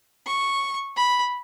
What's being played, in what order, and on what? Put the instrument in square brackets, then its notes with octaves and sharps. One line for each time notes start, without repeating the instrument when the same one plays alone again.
[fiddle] C#6
B5